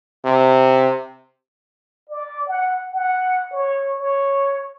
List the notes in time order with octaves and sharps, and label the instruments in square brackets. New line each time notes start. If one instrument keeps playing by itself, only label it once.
[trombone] C3
[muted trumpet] D5
F#5
F#5
C#5
C#5